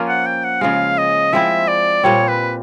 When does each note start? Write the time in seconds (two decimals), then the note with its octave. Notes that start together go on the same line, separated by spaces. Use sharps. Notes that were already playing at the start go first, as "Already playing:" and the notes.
Already playing: F3 A#3 C#4 F4
0.09 F#5
0.26 G5
0.44 F#5
0.61 C#3 F3 G#3 F5
0.98 D#5
1.33 F3 G#3 C4 E4 E5
1.68 D5
2.04 A#2 G3 C4 C#5
2.28 B4